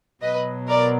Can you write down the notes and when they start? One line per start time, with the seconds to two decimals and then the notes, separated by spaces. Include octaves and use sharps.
0.22 B2 F#3 B4 D#5
0.69 A#4 D5